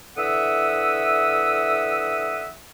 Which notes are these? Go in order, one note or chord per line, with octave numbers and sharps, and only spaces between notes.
D3 E3 E5 F#5 D#6 E6